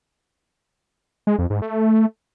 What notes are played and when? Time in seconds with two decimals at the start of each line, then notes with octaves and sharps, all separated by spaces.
1.27 G#3
1.39 F2
1.50 G#2
1.62 A3